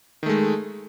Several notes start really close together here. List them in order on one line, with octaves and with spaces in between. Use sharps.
D#3 A3 G#3